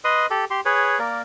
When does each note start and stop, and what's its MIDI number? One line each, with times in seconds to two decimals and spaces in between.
0.04 0.26 71
0.04 0.26 75
0.04 0.26 84
0.04 0.26 87
0.30 0.45 67
0.30 0.45 69
0.50 0.61 67
0.50 0.61 84
0.65 0.99 68
0.65 0.99 71
0.65 0.99 73
0.99 1.22 58
0.99 1.22 70
0.99 1.22 74